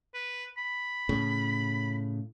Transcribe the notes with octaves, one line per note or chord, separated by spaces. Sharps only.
B4
B5
A2 C#3